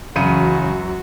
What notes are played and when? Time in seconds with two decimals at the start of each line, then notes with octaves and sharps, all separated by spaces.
0.16 C#2 F#2 C#3 E3 F#3 F#4 C#7 D#7